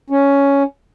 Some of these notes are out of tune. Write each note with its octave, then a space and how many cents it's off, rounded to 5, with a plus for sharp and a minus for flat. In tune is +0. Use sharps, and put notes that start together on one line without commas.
C#4 +5